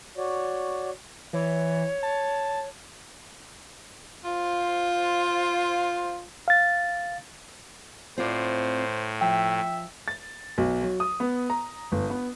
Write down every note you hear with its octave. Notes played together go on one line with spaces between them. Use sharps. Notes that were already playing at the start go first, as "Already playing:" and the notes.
F#4 C#5 D5
E3 C#5
A5
F4 C5
F5 A6
A2 C4 F4 C5 D5
F3 E5 G5
A6
B1
F#3
D#6
B3
A#5
G1
B3